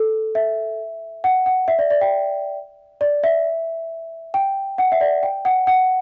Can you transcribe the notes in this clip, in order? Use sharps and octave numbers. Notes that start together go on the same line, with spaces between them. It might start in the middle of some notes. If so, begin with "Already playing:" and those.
Already playing: A4
E5
F#5
F#5
E5
D5
D5
G5
D5
E5
G5
F#5
E5
D5
G5
F#5
F#5